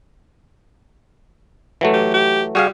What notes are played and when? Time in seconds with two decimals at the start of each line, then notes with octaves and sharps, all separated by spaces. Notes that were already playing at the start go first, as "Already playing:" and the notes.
1.81 E3 F#3 A3
1.93 G4
2.14 G4
2.55 G3 F#4 G#4 F5